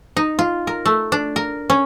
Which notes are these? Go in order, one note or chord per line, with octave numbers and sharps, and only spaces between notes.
D#4
F4
A#4
A3
D4
A#4
C#4